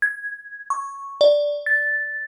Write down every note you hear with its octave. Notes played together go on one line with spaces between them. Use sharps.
G#6
C#6
D5
A6